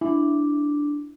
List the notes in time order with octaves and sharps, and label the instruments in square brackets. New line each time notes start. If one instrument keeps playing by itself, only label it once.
[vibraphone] D4 [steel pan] E4